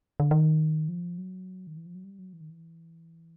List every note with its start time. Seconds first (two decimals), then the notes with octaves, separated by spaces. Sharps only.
0.20 D3
0.31 D#3
0.89 F3
1.18 F#3
1.67 D#3
1.77 E3
1.86 F3
1.95 F#3
2.04 G3
2.19 F#3
2.33 E3
2.41 D#3
2.50 E3